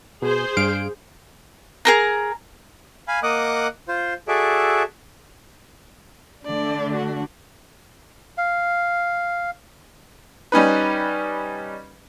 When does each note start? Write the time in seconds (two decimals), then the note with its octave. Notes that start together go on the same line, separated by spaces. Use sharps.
0.22 B2 G#4 C5
0.57 G2 F5 D7
1.85 G#4 A#4 A#5
3.08 F5 G#5 B5
3.23 A#3 D#5 F#5 D6 D#6 F#6
3.88 F4 C5
4.28 F#4 G#4 A4 D5 E5
6.45 D3 A3 D4 D5
6.94 F#4
8.38 F5
10.52 G3 C#4 D#4 B4